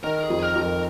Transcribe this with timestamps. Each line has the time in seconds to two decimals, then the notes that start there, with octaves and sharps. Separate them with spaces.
0.03 D#3 A#4
0.23 G#4
0.30 F2
0.42 A#4
0.55 F2
0.62 A#4